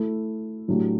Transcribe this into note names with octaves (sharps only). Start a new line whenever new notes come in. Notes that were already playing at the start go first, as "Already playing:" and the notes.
Already playing: A3 E4 A4
A2 F#3 A3 D4 G4